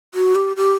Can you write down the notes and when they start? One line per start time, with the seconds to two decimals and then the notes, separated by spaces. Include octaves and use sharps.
0.14 F#4
0.35 G4
0.56 G4